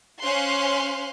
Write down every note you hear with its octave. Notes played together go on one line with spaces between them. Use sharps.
C#4 C5 F5 C6 F#6